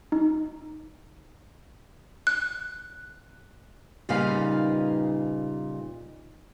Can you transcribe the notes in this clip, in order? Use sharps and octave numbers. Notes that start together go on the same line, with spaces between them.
D#4
F#6
A#2 C#3 G3 D#4 B4 F5